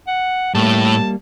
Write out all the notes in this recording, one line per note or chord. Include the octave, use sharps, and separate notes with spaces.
F#5
A2 G3 A#3 A5